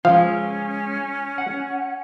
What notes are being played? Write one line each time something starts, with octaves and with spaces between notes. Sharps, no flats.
F3 G#3 C#4 F4 F5
F#5